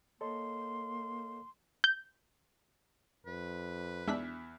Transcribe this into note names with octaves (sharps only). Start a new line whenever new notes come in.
A#3 A4 C#5 D#5 C6
G6
F2 B4
E2 G#3 D4 E5 F#6 B6